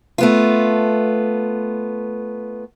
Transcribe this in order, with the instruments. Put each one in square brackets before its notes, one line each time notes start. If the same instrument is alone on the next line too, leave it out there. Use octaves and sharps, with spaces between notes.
[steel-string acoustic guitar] A3 B3 F4